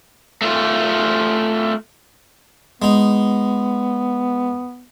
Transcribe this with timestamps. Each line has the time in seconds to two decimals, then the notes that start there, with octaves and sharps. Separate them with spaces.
0.42 A3 F4
2.82 G#3 B3 D#4